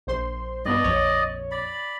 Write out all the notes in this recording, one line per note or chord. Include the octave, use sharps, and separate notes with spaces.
A#1 C5 C6
G2 B3 D4 D5 D#5
A#1 F2 C#5
D5 B5